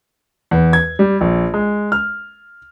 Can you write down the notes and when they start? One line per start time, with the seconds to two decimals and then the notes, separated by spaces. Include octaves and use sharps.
0.51 E2
0.73 G#6
0.99 G3
1.21 A#1
1.54 G#3
1.92 F6